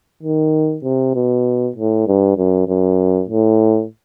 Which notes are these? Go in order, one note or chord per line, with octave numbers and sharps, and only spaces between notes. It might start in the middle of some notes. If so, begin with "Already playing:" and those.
D#3
C3
B2
A2
G2
F#2
F#2
A2